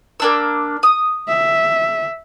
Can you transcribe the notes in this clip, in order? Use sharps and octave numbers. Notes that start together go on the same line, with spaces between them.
A#3 D4 E6
D#6
E5